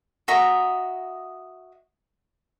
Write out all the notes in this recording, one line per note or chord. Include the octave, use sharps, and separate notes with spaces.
F#4 D#5 E5 A#5